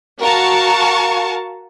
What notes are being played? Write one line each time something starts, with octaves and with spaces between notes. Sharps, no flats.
F#4 A#4 F5 A5 C#6